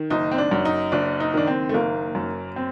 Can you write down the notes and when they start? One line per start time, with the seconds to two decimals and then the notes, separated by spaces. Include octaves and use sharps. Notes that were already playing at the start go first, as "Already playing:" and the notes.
Already playing: D#3
0.10 F#1 D#4
0.31 C4
0.38 D4
0.51 F#2
0.65 D#4
0.92 F#1 D4
1.20 D#4
1.34 D#3 D4
1.47 C4
1.69 A3
1.74 F#1 A#3
2.15 F#2
2.56 C4